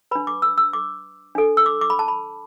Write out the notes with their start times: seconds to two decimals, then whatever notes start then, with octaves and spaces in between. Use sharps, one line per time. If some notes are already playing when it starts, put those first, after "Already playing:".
0.11 D4 B4 B5
0.27 D6
0.42 E6
0.58 E6
0.73 D6
1.35 D4 A4
1.57 E6
1.66 D6
1.81 D6
1.90 B5
1.99 A5
2.08 B5